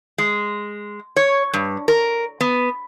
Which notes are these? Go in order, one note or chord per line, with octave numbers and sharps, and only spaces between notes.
G#3
C#5
G2
A#4
B3